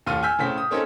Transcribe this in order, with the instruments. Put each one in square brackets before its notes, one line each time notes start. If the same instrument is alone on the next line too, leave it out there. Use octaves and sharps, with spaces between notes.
[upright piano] D#2 A2 F4 F6 D#7
G#5 E6 F6 G6 B6
A2 C#3 C4 B6
D#6
A#3 C4 C#4 D#4 G#4 A4